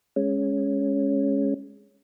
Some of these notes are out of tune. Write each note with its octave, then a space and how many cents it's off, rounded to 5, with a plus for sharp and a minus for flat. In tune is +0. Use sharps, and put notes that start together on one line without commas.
G#3 +0 C#4 +0